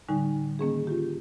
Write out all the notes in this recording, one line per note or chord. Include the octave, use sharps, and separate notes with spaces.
A2 D3 G3 D#4 G#5
D#3 A#3 C#4 G#4
F4 G4